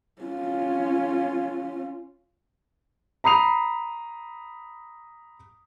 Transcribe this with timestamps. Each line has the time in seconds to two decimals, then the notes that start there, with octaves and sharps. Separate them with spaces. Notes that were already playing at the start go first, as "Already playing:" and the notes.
0.22 C#4 F4
3.24 A#5 B5 D#6 C7 F7